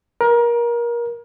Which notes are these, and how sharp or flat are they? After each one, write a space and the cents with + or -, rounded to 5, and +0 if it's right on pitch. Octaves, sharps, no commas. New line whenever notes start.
A#4 +25